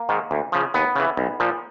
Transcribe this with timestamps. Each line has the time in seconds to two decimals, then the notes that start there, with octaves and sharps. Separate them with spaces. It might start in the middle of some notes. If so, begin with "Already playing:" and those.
Already playing: A#3
0.09 G#2 D#3
0.31 D2
0.52 C#3 F3
0.74 D#2 B3
0.96 C#3 E3
1.17 B1
1.40 A#2 F3